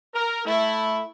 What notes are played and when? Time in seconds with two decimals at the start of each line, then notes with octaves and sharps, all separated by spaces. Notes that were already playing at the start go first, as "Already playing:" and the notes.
0.14 A#4
0.45 A3 E4